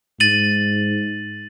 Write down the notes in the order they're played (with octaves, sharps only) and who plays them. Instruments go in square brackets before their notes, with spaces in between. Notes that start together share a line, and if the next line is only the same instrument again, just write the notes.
[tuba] G#2 [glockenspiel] A6 D#7 F#7